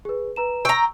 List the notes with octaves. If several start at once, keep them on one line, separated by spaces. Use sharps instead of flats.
G#4 B4
B4 A#5 E7
G5 A#5 C#6 E6